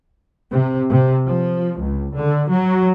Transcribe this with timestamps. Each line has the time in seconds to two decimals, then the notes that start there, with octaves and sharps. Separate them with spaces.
0.52 C3
0.91 C3
1.27 F3
1.80 C#2
2.16 D3
2.49 F#3